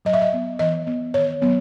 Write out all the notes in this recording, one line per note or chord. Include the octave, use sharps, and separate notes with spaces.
F#3 D#5
E5
D#5
B3
E3 D#5
B3
D#3 C#5
F#3 B3